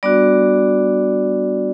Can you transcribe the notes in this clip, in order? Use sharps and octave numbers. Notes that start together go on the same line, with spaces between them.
G3 B3 D4 F#4 D5